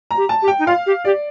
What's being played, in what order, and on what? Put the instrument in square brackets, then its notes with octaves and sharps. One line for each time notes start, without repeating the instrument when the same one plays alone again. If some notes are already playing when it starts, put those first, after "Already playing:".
[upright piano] A#5
[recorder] G4
[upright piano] A5
[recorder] G4
[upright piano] G5
[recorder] D#4
[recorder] F4 [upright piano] F5
[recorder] G4
[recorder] G4 [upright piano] D5